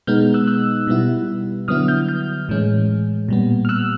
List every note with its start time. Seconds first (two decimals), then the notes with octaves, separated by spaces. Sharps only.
0.07 B2 G#3 B3 D#4 F6 G6
0.34 E6 F#6
0.47 E6 F#6
0.87 B2 G3 B3 E4
1.68 D3 F#3 B3 E4 D#6 F6
1.88 F6 G6
2.09 F6 G6
2.49 A2 E3 G#3 C#4
3.29 A#2 G3 B3
3.65 F6
3.69 E6 F#6